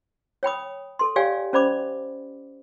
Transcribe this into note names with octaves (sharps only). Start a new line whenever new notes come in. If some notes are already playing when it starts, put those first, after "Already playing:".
C#5 G5 B5 D#6
A4 C6
G4 C#5 D5 F5 G5 G#5
C#4 C5 D5 B5 D6